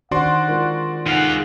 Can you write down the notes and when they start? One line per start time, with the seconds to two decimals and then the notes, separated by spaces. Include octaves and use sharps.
0.11 D#3 D4 F#4 C5 D5 F#5 C6
0.48 G#3 F4 A#4
1.06 G#3 D#4 A4 F5 F#5